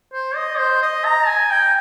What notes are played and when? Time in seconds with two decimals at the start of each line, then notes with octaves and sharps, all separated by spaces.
0.13 C5
0.35 D#5
0.58 C5
0.82 D#5
1.05 A#5
1.27 G#5
1.51 G5